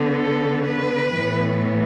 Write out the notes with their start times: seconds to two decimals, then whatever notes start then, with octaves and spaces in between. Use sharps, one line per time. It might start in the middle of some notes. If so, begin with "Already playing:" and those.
Already playing: D3 B3
0.14 A4
0.65 B4
1.16 A2 E3 B3